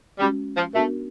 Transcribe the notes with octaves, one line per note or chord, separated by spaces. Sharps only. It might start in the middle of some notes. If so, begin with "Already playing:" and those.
G3 G#3 C#4 F#4
F3
A3 B3 D4 F#4 A#4